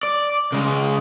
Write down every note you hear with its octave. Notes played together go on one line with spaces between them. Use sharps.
D5
C#3 G#3